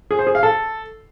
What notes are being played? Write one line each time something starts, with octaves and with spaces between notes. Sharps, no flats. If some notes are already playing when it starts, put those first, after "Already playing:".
G#4
C5
G#4
F5
A4